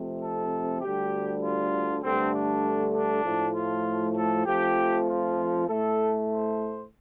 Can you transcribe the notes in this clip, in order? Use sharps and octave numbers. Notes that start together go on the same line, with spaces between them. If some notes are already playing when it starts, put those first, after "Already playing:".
Already playing: F2 C3 A3
A4
D2 D3 G3 G4
F4
G2 D3 A3 C4
D4
D4
A2 F3 A3
F4
A4
F2 F3 A3 G4
F4
A2 A3 A4
C5